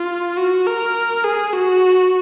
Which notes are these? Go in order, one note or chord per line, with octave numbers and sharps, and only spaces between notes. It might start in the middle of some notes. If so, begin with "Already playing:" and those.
Already playing: F4
F#4
A#4
G#4
F#4